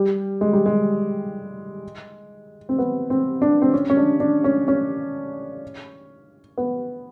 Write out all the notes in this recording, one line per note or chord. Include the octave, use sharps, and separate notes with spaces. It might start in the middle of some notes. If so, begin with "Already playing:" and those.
Already playing: G3
G#3
G3
G#3
C4
B3
C4
D4
C4
C#4
C#4
D4
D4
C#4
C#4
B3